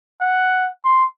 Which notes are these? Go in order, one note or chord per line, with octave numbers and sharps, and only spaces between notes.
F#5
C6